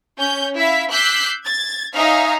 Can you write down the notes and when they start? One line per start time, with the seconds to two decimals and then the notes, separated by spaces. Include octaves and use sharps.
0.19 C#4 G6
0.56 E4 E5 F5 B6
0.91 D6 E6 F#6 G6 B6 C7
1.45 G#6 A6
1.94 D#4 C#5 E5 F5 G#5 A#5